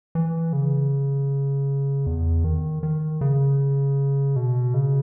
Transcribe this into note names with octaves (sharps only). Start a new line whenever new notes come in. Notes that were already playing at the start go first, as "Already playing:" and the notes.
E3
C#3
E2
D#3
D#3
C#3
B2
C#3